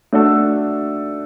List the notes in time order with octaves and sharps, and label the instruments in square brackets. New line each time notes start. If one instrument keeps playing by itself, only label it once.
[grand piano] A3 D4 F#4 A4